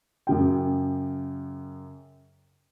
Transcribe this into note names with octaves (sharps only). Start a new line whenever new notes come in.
F#2 C#3 G5